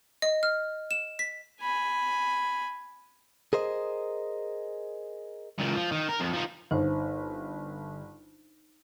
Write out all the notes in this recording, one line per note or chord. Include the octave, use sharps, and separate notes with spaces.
D#5
F6
E7
B6
G#5 B5
G#4 A#4 C5 D#5
C#2 A#2
F3
D#3
A#4
F2
F3 D#4
G1 D#4 C5